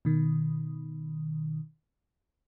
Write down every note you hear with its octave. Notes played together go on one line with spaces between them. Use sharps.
B2 D#3